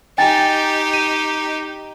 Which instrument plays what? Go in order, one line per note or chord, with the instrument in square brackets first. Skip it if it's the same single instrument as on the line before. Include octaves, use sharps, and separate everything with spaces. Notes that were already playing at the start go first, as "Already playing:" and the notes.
[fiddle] D#4 G4 [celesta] G5 G#5 A6
[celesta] D#7